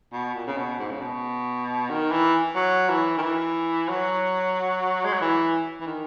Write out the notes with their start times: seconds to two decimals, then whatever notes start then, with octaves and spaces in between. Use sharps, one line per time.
0.13 B2
0.35 A#2
0.47 C#3
0.57 B2
0.79 G#2
0.91 C#3
1.02 B2
1.90 D#3
2.12 E3
2.56 F#3
2.90 E3
3.18 D#3
3.22 E3
3.89 F#3
5.05 G#3
5.13 F#3
5.21 E3
5.81 E3
5.87 D#3